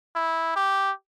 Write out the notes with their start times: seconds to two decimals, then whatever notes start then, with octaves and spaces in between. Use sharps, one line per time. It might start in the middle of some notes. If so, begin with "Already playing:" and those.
0.16 E4
0.56 G4